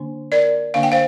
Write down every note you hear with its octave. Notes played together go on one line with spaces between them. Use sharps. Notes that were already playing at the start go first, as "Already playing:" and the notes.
Already playing: D3 A#3 D4
A#4 D5
D3 A#3 D4 F5
G5
C5 F5